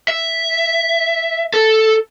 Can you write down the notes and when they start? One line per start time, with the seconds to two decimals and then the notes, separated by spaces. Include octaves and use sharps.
0.08 E5
1.54 A4